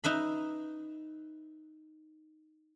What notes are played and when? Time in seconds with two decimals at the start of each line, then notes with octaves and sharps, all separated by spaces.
0.04 D#4 B4 E5 B5